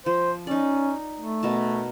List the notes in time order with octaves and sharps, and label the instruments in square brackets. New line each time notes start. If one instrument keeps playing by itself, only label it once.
[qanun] F3 [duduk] C5
[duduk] C#4 [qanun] D#4 D5
[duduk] A3
[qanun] B2 A#4 A5